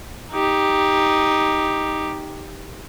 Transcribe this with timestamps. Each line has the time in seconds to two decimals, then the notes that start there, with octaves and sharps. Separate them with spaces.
0.32 D#4 G4